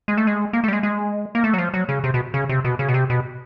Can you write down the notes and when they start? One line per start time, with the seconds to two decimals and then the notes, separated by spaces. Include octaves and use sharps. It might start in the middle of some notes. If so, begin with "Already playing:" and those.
0.08 G#3
0.17 A3
0.27 G#3
0.53 A#3
0.64 A3
0.68 G3
0.73 G#3
0.83 G#3
1.35 A#3
1.44 A3
1.54 F#3
1.58 F3
1.74 F#3
1.89 C#3
2.04 C3
2.14 B2
2.34 C#3
2.49 C3
2.65 B2
2.79 C#3
2.88 B2
2.94 C3
3.10 B2